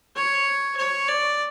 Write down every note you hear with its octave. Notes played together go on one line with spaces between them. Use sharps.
C#5
C#5
D5